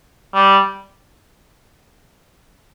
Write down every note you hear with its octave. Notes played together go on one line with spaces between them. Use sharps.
G3